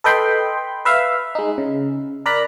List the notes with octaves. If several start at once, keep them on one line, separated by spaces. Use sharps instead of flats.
A4 B4 D#5 G5 B5 C6
B4 E5 F5
G#3 D#4
C#3
A#4 D5 A#5 B5 F#6